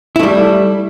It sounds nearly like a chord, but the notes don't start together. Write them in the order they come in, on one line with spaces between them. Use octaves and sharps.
E4 A3 G3